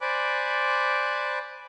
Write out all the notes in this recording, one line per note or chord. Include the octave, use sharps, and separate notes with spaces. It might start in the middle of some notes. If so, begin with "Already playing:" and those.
C5 D5 G#5 B5 D6 F#6